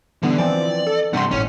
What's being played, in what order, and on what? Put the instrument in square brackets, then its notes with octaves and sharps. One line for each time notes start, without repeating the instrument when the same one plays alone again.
[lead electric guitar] D3 [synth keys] E3 G3 B3
[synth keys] E3 F3 C4 [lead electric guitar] D5
[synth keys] A4
[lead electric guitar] G2 C3 [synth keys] F#5 C6
[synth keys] G#1 A2 [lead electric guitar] C#4